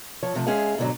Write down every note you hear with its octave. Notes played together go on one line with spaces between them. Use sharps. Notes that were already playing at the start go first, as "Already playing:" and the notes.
F3 C#5
C3 F3 A3
G#3 C#4 G#4 E5 F5
G#2 B2 D3 F3 F#3